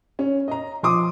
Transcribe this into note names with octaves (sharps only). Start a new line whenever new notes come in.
C#4
D#5 A#5
F3 C6 D6 D#6